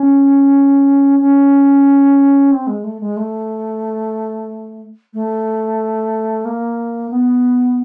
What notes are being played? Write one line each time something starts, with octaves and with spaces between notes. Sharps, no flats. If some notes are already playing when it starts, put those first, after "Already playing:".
Already playing: C#4
C#4
C4
G#3
A3
G#3
A3
A3
A#3
B3